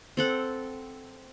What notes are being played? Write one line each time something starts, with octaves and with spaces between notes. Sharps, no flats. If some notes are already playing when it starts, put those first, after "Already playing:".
C4 A4 F#5